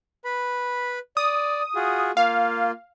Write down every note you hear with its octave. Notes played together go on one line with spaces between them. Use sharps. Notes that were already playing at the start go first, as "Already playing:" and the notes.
B4 B5
D5 D#6
F4 F#4 G#4
A#3 F4 F5